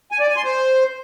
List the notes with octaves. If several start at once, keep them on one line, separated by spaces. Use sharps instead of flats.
G#5
D5
G#5
C6
C5